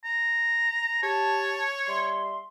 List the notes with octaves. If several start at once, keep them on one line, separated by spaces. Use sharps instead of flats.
A#5
G4 C#5 A5
G3 E5 C6